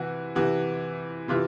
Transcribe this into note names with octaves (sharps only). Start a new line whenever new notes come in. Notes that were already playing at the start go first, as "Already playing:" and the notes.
Already playing: C3 E3 F#4
C3 E3 F#4
C3 E3 F4